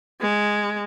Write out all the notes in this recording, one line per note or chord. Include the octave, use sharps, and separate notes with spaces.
G#3